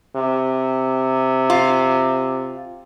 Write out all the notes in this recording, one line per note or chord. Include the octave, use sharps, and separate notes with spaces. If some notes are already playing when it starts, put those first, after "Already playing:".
C3
F4